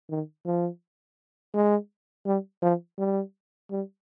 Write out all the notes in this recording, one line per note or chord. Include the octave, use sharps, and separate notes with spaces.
D#3
F3
G#3
G3
F3
G3
G3